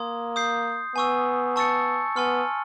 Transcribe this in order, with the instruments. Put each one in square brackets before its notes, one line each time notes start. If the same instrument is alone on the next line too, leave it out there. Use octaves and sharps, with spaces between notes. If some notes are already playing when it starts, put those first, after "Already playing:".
Already playing: [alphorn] A#3 [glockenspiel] C6 D#6 G#6
[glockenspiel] D#6 G6 C7
[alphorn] B3 [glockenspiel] G#5 C#6 E6
[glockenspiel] A5 C#6 E6 A6 C#7
[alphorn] B3 [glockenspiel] G#5 C6 F6